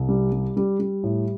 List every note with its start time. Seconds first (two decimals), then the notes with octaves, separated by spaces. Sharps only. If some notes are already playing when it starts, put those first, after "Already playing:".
Already playing: C2
0.09 G3
0.32 G3
0.57 G3
0.79 G3
1.03 A2